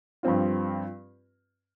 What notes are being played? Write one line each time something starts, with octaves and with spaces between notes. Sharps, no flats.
G2 F3 C4 F4